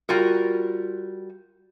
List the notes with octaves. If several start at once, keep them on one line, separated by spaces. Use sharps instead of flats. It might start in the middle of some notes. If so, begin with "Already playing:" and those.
G3 F4 F#4 A#4